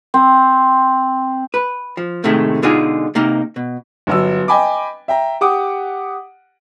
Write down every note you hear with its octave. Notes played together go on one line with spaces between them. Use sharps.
C4
B4
F3
A2 C3 D#3 G#3 A3
B2 D3 G#3 D#4 F4 G#4
C3 A#3 D#4
B2
G1 F#3 E6
D#5 G5 G#5 B5 D6
E5 G5 A#5
G4 F#5 D6 D#6